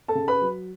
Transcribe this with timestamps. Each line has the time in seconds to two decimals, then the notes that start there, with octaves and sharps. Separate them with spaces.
0.08 A4 A5
0.15 C#3
0.28 B4 B5
0.41 F#3